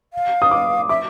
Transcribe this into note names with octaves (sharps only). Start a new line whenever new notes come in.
F5
D#6
D6
E5 D6